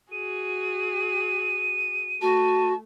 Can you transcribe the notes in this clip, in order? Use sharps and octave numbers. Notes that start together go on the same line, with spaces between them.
F#4 G#4 D#7
A3 F#4 A5